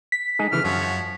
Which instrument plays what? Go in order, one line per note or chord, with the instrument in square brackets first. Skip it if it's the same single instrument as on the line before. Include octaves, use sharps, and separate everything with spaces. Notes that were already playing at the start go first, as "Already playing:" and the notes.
[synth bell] B6
[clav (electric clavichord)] G#3 D#4 G#4
[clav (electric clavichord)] C#3 E3 [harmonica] F6
[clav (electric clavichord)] F#2 [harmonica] F3 F#4 C#5